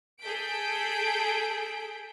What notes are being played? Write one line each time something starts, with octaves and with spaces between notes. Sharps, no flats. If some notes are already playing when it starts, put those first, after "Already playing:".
G#4 A4 G6 B6 D7